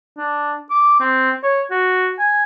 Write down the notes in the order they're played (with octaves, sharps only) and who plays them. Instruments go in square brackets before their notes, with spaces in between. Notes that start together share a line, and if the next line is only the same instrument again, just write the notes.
[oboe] D4
D6
C4
C#5
F#4
G#5